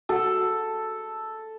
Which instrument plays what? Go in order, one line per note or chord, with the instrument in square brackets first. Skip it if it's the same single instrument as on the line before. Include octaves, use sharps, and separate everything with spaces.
[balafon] F#4 F#5 [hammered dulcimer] A4